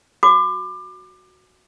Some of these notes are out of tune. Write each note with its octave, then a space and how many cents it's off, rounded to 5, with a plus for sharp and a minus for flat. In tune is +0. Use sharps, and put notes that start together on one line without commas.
F#4 -5 D6 +25